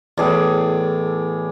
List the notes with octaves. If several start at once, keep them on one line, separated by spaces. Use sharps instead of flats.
E2 A2 G#4 D5